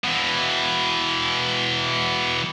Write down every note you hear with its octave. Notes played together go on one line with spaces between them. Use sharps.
B2 E3